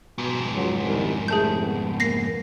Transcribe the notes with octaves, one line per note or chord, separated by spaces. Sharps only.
F2 G#2 B2
C#2 F#3
C2 D#3
C2 A3 G#4 A5 G6
B3
A#3 A#6 C7